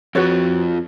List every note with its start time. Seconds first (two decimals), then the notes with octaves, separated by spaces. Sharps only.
0.15 F2 F3 F#4 B4 C#5